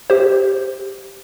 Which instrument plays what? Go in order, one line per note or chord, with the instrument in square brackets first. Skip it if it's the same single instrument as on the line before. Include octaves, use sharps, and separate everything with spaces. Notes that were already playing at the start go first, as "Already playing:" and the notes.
[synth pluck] G4 C5